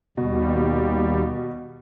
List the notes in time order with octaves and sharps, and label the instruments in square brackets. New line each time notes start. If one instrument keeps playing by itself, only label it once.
[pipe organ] D#2 G3 [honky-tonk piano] B2